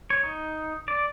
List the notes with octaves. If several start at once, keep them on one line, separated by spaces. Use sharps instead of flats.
C#5
D#4
D5